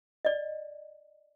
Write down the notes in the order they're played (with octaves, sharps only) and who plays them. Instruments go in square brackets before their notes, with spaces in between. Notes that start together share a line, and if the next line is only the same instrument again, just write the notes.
[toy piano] D5 D#5